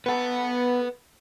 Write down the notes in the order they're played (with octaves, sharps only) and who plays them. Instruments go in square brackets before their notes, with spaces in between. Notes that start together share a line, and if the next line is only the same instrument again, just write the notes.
[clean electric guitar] B3 A4 [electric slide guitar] B4 F#5